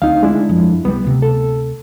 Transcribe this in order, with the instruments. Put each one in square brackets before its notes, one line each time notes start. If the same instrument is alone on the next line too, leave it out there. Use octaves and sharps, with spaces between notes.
[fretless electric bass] D2 [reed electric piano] C4 D#4 F5
[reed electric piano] G#3 D4 E4
[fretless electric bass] G1 F2
[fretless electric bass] C2 G3 [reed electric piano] B3
[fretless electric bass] D2 C3
[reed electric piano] A4